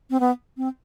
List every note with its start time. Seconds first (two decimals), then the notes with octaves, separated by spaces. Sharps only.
0.10 C4
0.20 B3
0.57 C4